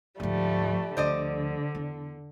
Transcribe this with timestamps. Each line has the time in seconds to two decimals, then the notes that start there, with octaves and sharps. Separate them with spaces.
0.20 D2 G#2 F3 G3 A3
0.97 D2 D3 F3 C5 D5 D#5
1.75 E2